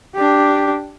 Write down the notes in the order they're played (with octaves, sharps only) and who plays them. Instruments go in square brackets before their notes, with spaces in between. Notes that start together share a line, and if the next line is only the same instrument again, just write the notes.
[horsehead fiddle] D4 G4